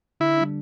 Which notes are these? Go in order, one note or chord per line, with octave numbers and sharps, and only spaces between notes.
D3 E4
G3 D4